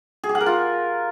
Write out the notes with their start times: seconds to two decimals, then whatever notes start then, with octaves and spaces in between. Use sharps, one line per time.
0.24 G#4
0.29 G4
0.35 F#5
0.41 A#4
0.46 F4